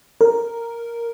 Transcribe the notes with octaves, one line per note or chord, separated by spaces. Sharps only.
A#4